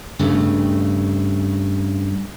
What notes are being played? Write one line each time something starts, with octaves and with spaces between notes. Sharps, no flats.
G2 C#3 A3